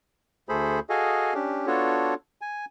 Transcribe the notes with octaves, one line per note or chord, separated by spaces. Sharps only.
D2 A3 G#4 A4 C5 B5
F#4 G#4 A4 D#5 F5 G#5
C#4 D4 G4
B3 D4 F4 F#4 A4 C#5
G#5